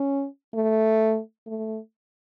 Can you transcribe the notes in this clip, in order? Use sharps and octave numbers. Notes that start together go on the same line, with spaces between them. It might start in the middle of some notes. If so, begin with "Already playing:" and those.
Already playing: C#4
A3
A3